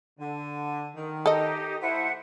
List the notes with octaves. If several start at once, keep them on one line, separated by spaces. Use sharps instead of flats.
D3
D#3
D#4 G4 A4 D#5
A3 E4 C5 E5 F#5